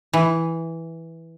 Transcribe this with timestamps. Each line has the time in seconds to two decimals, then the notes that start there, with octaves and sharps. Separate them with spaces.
0.13 E3